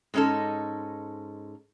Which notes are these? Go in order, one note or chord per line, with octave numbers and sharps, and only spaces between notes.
G#2 G#3 C#4 D#4 A4